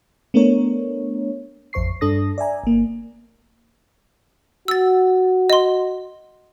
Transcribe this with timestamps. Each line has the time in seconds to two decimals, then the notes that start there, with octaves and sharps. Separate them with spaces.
0.34 A3 B3 D4 A#4 C#5
1.73 A1 F2 C5 C#6 C7
2.01 G2 D4 A4 D#6 A#6
2.38 D5 E5 G#5 A#5
2.64 G1 A#3
4.68 F#4 E6 A6
5.50 D#5 C6